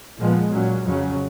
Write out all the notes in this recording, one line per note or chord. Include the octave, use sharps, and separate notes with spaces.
A#2 F3 G#3 B3
A#2 F#3 C#4
F2 C#3 F#3 C#4